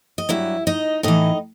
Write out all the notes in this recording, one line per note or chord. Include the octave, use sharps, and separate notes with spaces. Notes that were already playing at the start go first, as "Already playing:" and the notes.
D#5
G2 F#3 E4 E5
D#4 D#5
A2 E3 D#4 D#5